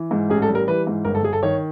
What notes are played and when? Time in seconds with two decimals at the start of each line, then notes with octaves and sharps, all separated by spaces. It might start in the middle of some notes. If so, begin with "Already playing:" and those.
Already playing: E3
0.11 G#2
0.30 A1 G#4
0.42 A4
0.48 G3
0.55 A#4
0.68 E3 B4
0.87 G#2
1.05 G1 A#4
1.15 A4
1.23 G1 G#4
1.33 A4
1.43 D#3 C#5